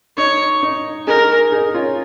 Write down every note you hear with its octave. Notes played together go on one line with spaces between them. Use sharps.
D#4 C#5
D#4
D#4 G#4 A#4
D#4 G#4
C#4 F4